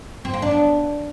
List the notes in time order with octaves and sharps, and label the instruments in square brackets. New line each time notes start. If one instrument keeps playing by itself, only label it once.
[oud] C4
A#3
D4
B3